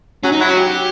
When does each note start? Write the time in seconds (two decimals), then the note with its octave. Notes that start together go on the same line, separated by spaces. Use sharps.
0.23 F#3 C#4
0.32 D#4
0.40 F#3 E4
0.49 F#4
0.57 G4